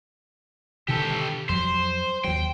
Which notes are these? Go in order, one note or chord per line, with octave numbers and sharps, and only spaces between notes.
B2 D3 D#3 G4 A4
F2 F#3 G3 C5
D#2 F#3 G5